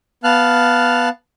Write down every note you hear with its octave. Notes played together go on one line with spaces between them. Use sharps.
B3 F5 A5 F6 F#6